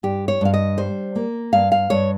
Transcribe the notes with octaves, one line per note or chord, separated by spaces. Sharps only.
G2 G4
C#5
G2 F5
D#5
G3 C5
A#3
G2 F5
F5
G2 C#5